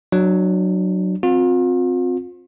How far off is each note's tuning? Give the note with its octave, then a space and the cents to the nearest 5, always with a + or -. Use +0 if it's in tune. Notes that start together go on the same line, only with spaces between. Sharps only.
F#3 +0 D4 +35
C4 +0 F4 +40